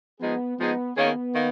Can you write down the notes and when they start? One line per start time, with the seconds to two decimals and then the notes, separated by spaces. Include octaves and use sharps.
0.21 F3 G#3 B3 D#4 G#4
0.59 F3 G#3 B3 D#4 G#4
0.96 D#3 A#3 B3 C#4 G#4 C#5
1.34 D#3 A#3